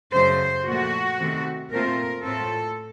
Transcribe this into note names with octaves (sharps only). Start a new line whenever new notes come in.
F#2 C#3 A3 C5
A#2 F3 A3 F#4
C3 D#3 A3 C4
A#2 A3 C4 F4 A#4
A2 A3 C4 F4 A4